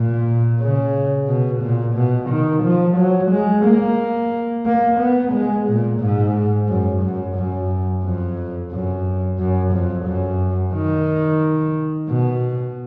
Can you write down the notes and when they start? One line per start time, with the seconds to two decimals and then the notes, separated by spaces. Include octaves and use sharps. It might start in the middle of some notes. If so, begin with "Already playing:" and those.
Already playing: A#2
0.61 C#3
1.27 B2
1.62 A#2
1.95 B2
2.29 D#3
2.63 F3
2.97 F#3
3.31 G#3
3.64 A#3
4.66 A#3
5.00 B3
5.33 G#3
5.68 A#2
6.01 G#2
6.69 F#2
7.02 F#2
7.36 F#2
8.03 F2
8.71 F#2
9.39 F#2
9.73 F2
10.06 F#2
10.74 D#3
12.09 B2